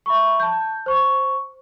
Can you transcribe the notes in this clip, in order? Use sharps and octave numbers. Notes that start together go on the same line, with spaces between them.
E5 B5 C#6
A5 G6
C5 C#6